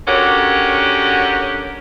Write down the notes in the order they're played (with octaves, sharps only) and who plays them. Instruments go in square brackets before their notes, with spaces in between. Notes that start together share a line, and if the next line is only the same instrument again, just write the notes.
[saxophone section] D3 C#4 F#4 G4 A#4 C#5